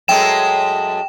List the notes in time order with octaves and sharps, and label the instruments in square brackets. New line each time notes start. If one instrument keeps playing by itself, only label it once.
[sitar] F#2 G#3 A3 [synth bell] G5 E7